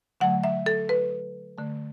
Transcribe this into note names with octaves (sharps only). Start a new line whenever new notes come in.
D3 F#3 A3 F#5
E5
A4
B4
D3 A3